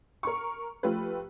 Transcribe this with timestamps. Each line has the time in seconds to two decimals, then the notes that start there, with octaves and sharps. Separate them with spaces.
0.23 A#4 C#6
0.83 F3 A3 F4 G4 B4